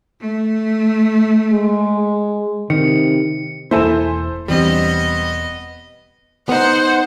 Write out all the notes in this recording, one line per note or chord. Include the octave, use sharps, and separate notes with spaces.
A3
G#3
C3 D#3 C#7
E1 A#3 E4 A4 C5 E5 G#5
E1 E3 G3 B3 C4 D4 D#5
B3 D#4 C5 F#5 C6